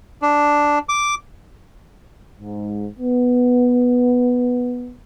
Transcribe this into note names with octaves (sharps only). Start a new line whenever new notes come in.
D4
D6
G#2
B3